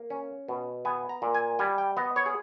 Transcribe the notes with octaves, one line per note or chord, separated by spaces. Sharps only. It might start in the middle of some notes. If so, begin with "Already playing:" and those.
Already playing: A#3
C#4
B2
B3 G#5
A#5
A#2
G#5
G3 G#5
G5
B3 D#5
C#5
G#4